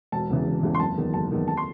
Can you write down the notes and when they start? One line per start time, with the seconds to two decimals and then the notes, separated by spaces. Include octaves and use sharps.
0.12 E1 A5
0.30 E2 C#3 E3
0.47 E1
0.63 E2 C#3 E3
0.75 C6
0.80 F#1 A5
0.97 E2 D#3
1.14 F#1 A5
1.31 E2 D#3
1.48 A5
1.57 C6